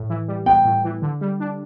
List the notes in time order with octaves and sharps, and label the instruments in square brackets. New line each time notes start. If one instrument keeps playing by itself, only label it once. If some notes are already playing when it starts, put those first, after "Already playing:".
Already playing: [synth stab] A2
E3
G3
[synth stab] B3 [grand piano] G5
[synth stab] A2
E3
D3
G3
D4